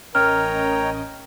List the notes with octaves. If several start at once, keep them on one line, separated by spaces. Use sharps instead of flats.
A1 C#4 A#4 C#5 D#5 G5 A#5 F6